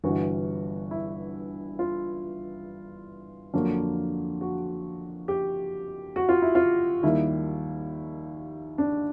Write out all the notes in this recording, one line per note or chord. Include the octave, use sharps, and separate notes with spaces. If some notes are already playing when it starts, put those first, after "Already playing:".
G1 G2 E3 F#4
E4
F4
F2 D3 F#3 A#3
F#4
G4
F#4
F4
E4
F4
D#2 D#3 G3 A#3 E4
D4